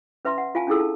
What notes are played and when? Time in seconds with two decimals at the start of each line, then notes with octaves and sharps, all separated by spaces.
0.25 C#4 B4 E5 A#5 C6
0.38 F#5
0.55 F4 F5 G#5 A5
0.67 C#4 D4 E4 G#4 A4 E6
0.80 A5